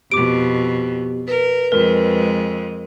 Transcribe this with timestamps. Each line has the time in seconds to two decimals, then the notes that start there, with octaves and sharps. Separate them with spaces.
0.12 F2 B2 B3 G4 D6 D7
1.28 A#4 B4
1.72 F2 G#3 A#4